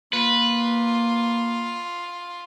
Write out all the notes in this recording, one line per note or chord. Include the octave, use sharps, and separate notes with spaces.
A#3 F4 B4